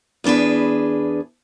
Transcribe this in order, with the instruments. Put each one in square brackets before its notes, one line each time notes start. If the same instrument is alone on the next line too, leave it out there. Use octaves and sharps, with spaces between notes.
[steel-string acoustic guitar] E2 B3 D4 G#4 B4